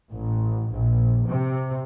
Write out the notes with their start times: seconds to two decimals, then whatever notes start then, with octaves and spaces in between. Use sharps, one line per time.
0.12 A1
0.72 A#1
1.28 C3